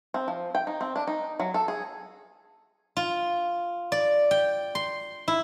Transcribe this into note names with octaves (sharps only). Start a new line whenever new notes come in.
C4
F3
G5
D#4
C4
D4
D#4
F#3
A4
G#4
F4
D5
G5
C6
E4